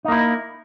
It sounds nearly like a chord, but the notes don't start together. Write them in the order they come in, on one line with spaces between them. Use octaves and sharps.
D#4 A#3 E4